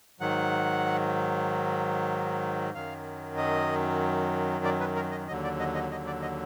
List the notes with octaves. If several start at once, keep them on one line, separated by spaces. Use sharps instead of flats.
G#2 D#3 F#3 F#5
F#2 D#3 F#3 F5
D#5
D5
B4
A#4
D#5
D#2 D3 F#3 D#5
D5
D#5
D#5
D#5
D5
D#5